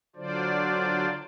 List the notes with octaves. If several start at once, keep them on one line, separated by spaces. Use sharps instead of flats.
D3 F#3 D4 F4 C5 D5